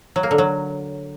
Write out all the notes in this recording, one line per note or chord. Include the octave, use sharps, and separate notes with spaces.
F#3
A#3
D3
F#3